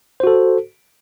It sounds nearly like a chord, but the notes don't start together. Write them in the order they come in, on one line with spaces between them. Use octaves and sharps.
C5 F#4 A4